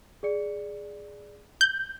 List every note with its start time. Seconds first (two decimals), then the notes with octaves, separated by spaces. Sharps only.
0.23 G#4 D5 C#7
1.61 G6 F#7